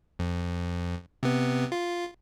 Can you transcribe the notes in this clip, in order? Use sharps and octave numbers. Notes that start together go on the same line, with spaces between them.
F2
C3 B3
F4